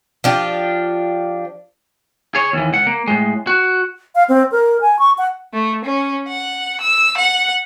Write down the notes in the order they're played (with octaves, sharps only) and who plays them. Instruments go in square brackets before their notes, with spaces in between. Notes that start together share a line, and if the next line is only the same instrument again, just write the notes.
[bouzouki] F3 D4 G4
[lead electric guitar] G#4 C#5
D#2 E3
C#2 F#5
A#3
A2 G#3
F#4
[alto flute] F5
C4
A#4
G#5
C#6
F#5
[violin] A3
C#4
F#5
E6
F#5